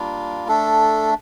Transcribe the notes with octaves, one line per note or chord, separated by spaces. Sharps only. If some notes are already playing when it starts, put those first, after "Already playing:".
Already playing: G3 A#3 D4 F4
A3 D4 A4